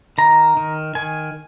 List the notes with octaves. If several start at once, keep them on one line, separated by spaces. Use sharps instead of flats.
D#3 A#5
D#3
D#3 G#5